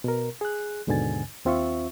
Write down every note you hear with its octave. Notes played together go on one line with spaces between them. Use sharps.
B2 A#4
G#4 F#6
D#2 G#2 B2 D3 G#5 A6
D#2 C4 F4 E5 C#6